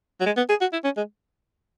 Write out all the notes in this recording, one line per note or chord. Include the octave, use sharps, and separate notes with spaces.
F#3
G#3
B3
G#4
F#4
E4
C#4
G#3